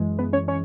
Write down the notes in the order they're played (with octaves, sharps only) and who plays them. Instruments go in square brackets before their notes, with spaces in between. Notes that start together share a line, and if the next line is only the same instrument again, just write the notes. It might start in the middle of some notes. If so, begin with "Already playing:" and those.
Already playing: [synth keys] F#2 E3 G#3
B3 B4
C#4 C#5
C#4 C#5